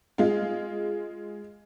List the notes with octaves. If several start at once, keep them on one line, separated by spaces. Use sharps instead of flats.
G#3 F4